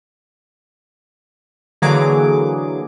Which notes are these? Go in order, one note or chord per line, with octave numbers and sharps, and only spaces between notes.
D3 E3 F#3 A#3 G#4 D6